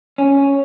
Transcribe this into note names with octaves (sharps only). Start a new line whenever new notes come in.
C#4